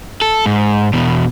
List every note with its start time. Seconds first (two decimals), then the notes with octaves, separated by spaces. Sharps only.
0.22 A4
0.46 G#2
0.93 E2 B2